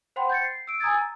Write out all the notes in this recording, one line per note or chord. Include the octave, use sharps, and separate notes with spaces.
C5 F#5 G5 B5 C6
G6 A6 C#7
C7
E6 D7
G#5 A#5 D#6 E6 G#6 A6
A#5